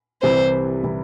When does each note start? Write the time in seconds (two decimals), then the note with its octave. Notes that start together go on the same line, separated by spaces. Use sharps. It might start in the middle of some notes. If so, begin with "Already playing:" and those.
0.22 C2 C3 E3 G3 E4 C5
0.84 C3 E3 G3 E4